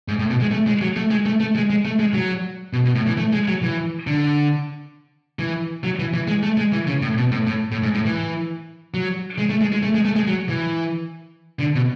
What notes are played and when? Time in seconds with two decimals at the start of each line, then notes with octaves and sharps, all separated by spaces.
0.08 G#2
0.19 A2
0.30 B2
0.41 G#3
0.51 A3
0.67 G#3
0.81 F#3
0.96 A3
1.11 G#3
1.26 A3
1.40 A3
1.56 G#3
1.70 G#3
1.85 A3
1.99 G#3
2.14 F#3
2.73 B2
2.85 B2
2.95 A2
3.07 E3
3.17 A3
3.33 G#3
3.48 F#3
3.63 E3
4.07 D3
5.39 E3
5.84 F#3
5.99 E3
6.14 E3
6.28 G#3
6.43 A3
6.57 G#3
6.72 E3
6.87 C#3
7.02 A2
7.17 B2
7.32 A2
7.47 A2
7.72 A2
7.83 G#2
7.94 A2
8.05 E3
8.94 F#3
9.38 G#3
9.49 A3
9.61 G#3
9.72 G#3
9.83 A3
9.94 G#3
10.05 A3
10.16 G#3
10.27 F#3
10.49 E3
11.60 D3
11.75 B2